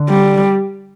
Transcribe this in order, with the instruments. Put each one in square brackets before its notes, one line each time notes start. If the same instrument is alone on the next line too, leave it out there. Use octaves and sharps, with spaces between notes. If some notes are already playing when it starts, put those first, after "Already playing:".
Already playing: [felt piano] D3
[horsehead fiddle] G3